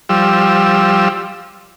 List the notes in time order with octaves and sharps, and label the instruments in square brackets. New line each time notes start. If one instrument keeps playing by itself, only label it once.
[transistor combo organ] F3 G3 E6